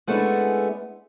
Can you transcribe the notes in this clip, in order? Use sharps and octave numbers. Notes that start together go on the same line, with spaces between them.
G#3 A3 B3 C#4 D4 E4